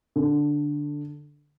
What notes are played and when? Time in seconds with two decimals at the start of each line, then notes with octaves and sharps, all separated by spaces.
0.16 D3